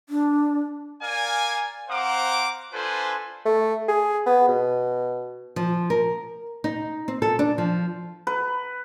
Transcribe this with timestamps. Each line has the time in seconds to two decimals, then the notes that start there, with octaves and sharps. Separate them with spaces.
0.09 D4
1.02 A#4 D5 F5 G#5
1.89 C4 C5 F5 F#5 A#5 D6
2.73 D4 F4 A4 B4 C5 G#5
3.46 A3
3.88 G#4
4.26 B3
4.48 B2
5.56 F3
5.90 A#4
6.64 D#4
7.08 C4
7.22 A4
7.39 D4
7.58 F3
8.27 B4